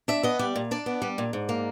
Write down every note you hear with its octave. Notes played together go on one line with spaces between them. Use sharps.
D4 E5
B3 D#5
G3 D5
A#2
D4 D5
B3
G3
A#2
G#2
A#3